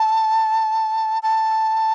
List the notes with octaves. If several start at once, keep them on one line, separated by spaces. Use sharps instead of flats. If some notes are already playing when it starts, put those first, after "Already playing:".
Already playing: A5
A5